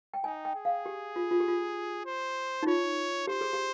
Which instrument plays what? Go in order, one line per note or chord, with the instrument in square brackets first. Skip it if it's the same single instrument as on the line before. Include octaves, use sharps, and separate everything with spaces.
[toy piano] G5
[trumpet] D#4 [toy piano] G#5
[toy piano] G5
[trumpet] G#4
[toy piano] F5
G4
F4
F4
G4
F4
[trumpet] C5
[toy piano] D#4
[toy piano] F4 [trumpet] C#5
[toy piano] G4 [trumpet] C5
[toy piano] G#4
G4